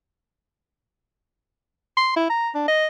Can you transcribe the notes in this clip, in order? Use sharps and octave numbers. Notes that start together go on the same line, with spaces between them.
C6
E4
A#5
D4
D#5